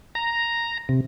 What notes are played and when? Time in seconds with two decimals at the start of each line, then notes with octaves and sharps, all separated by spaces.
0.15 A#5
0.89 C3